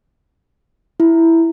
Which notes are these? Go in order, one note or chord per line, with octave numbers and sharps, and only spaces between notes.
E4